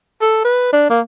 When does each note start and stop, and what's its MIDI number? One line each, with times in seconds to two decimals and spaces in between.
0.21 0.41 69
0.45 0.71 71
0.73 0.89 62
0.90 1.01 58